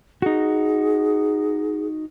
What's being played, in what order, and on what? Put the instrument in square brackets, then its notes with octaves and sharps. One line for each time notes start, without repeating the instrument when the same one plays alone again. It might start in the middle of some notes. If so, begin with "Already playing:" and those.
[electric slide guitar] D#4 F#4 [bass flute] G#4